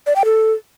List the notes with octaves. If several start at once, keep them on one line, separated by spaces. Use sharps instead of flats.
D5
G5
A4